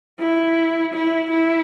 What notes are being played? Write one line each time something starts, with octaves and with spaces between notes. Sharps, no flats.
E4
E4
E4